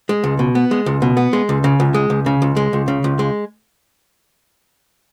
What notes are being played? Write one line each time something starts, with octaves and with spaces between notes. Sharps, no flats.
G#3
C#2
B2
B3
G#3
C#2
B2
B3
G#3
C#2
C#3
C#2
G#3
C#2
C#3
C#2
G#3
C#2
C#3
C#2
G#3